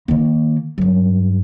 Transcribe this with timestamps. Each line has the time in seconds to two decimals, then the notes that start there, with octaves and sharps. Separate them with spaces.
0.08 D#3 A#3
0.78 G2 F#3